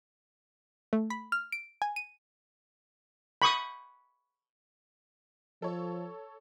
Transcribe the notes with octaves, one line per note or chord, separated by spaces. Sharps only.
A3
B5
F6
D7
G#5
D#7
B5 C#6 D#6
F3 A4 C#5